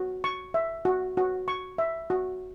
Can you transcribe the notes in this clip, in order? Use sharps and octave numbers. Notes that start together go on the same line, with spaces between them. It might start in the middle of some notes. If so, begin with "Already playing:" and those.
Already playing: F#4
C#6
E5
F#4
F#4
C#6
E5
F#4